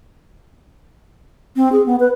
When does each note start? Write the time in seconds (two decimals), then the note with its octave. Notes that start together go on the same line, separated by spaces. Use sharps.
1.56 C4
1.72 G#4
1.86 B3
2.00 B4